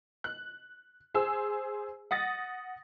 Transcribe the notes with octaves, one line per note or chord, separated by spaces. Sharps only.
F#6
G#4 C5 G#5 E6
F#5 D#6 A6 A#6